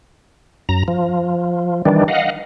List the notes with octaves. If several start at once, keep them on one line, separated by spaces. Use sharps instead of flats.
F#2 A#5
F3
D#3 E3 G3 D4
D#5 F5 F#5